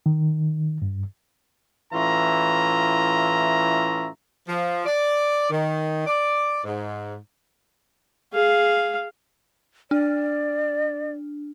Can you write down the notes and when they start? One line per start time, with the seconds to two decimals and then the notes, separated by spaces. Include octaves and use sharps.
0.06 D#3
0.82 G2
1.93 A2 E3 C#4 F4 E5 A#5
4.48 F3
4.85 D5
5.50 D#3
6.07 D5
6.64 G#2
8.33 G#4 F5
9.91 D4 D5